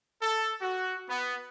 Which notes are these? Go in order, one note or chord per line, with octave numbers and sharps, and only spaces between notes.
A4
F#4
B3